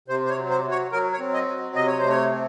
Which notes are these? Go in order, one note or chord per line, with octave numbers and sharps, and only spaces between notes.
C3 C5
C5
C#5
F#3
C5
F#3
C#5
F#3 A#4
C#5
C4
D#5
F#3
C3 D#5
C#5
C5
A3
C#5
C4